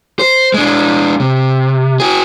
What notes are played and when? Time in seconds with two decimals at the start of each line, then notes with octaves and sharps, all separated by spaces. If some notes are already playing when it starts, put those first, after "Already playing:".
0.19 C5
0.54 G#3 D4
1.20 C3
2.00 F#4 G#4